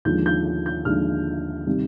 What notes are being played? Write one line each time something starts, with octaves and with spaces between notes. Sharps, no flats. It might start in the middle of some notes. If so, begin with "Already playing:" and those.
D#2 D3 F3 G#3 G6
G6
G6
D#2 D3 F3 G#3 F6
C3 D#3 G3